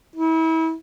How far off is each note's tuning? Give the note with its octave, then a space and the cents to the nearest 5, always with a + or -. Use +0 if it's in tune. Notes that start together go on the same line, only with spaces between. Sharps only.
E4 -35